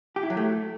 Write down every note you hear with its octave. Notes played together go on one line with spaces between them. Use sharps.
G4
E4
F#3
A3